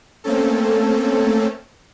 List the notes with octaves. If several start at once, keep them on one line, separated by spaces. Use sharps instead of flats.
A3 A#3 C4 C#4 A4